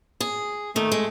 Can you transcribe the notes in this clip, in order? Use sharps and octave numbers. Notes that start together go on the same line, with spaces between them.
G#4
D#3 A3
G#3